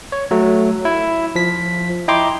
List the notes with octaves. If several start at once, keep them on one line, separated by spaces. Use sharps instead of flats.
C#5
F#3 A3
E4
F3 B6
E4 D#5 G5 A#5 C6 D6